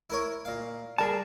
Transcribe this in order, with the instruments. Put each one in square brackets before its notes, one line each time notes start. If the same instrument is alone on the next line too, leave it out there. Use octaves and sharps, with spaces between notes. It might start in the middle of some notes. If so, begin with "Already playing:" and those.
[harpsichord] E4 A#4 C#5
A#2 F5
[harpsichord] G3 [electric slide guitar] G#4 A#4 A5